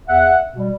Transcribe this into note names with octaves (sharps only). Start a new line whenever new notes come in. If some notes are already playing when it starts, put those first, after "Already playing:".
E2 E5 F#5
B2 G3